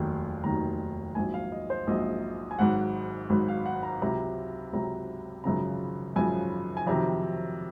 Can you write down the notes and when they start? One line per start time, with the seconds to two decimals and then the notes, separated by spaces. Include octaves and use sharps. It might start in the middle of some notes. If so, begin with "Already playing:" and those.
Already playing: F1 D#2 D#3 F#3
0.44 F1 D#2 D#3 F#3 A#5
1.15 A#1 G#2 F#3 G#5
1.34 F5
1.52 D#5
1.70 C5
1.87 A#1 G#2 F#3 D#5
2.51 G#5
2.59 G#1 G#2 F#3 F#5
3.30 G#1 G#2 F#3
3.48 F5
3.66 F#5
3.83 A#5
4.02 C#2 C3 F#3 A#5
4.73 C#2 C3 F#3 A#5
5.44 G#1 F#2 C#3 F3 A#5
6.16 G#1 F#2 C#3 F3 G#5
6.77 G#5
6.87 F2 C3 D#3 F#3 A#5